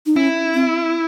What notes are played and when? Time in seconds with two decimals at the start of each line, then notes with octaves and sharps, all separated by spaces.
0.06 D#4
0.16 C#4 E4
0.54 C4